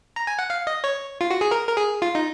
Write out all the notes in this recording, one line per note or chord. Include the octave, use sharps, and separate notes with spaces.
A#5
G#5
F#5
F5
D#5
C#5
F4
F#4
G#4
A#4
A#4
G#4
F4
D#4